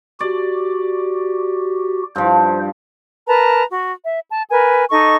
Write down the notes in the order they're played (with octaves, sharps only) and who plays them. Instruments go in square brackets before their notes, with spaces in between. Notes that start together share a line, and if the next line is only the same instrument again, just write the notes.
[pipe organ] F#4 G4 [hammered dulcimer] D5
[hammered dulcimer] G2 F3 [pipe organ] C5
[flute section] A#4 B4 A5 A#5
F#4
E5
A5
A#4 B4 G#5
D#4 A4 D#5 C#6